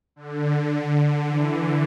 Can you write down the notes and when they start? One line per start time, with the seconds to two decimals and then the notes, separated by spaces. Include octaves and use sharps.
0.16 D3
0.91 D3
1.28 E3